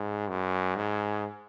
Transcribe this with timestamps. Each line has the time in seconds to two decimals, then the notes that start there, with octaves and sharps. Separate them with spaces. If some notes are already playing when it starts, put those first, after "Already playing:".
Already playing: G#2
0.28 F#2
0.76 G#2